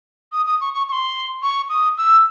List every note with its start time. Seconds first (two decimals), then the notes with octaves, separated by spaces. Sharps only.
0.32 D#6
0.46 D#6
0.61 C#6
0.73 C#6
0.88 C#6
0.92 C6
1.43 C#6
1.69 D#6
1.98 E6